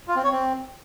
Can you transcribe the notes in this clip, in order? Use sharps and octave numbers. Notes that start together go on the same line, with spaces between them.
F4
C4
C#5
C4